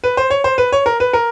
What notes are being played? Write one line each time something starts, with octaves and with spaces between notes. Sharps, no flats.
B4
C5
C#5
C5
B4
C#5
A#4
B4
A#4